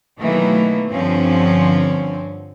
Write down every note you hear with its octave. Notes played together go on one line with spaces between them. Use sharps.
B2 D#3 E3 F#3 A3 A#3
G2 D3 F3 C4 C#4